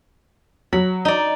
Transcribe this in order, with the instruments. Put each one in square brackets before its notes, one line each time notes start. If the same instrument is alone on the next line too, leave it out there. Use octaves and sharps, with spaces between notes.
[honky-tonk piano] F#3 [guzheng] B5
[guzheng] D#4 D5